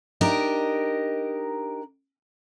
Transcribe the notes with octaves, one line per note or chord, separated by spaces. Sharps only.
D4 D#4 G4 A#4 D#5